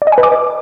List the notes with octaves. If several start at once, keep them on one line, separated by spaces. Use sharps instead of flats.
D5
D#5
G#5
B4
D6